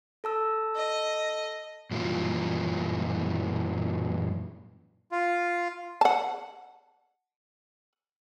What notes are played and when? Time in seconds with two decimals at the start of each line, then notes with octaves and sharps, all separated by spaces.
0.24 A4 A5 E6
0.76 D#5
1.91 F#2 A#2 E3 G3 E4 F4
5.12 F4
6.01 F#5 A5